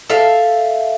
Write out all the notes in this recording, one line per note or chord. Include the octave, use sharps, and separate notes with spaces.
A4 E5 F5